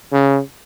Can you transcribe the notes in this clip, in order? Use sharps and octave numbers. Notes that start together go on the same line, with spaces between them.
C#3